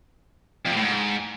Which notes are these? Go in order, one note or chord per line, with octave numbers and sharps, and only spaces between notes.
F2
C3
A2
G#2